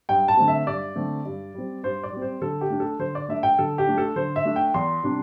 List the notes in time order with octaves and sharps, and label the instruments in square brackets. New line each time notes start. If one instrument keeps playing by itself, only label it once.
[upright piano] G2 G5
A5
D3 A3 C4
E5
G2 D5
D3 A3 C4
G2
G3 C4
G2 C5
D5
G3 C4
C5
D3 A4
G4
A3 D4
A4
D3 C5
D5
A3 D4 E5
G5
D3 A4
G4
A3 D4
A4
D3 C5
E5
A3 D4
G5
E2 C6
C3 G3 D4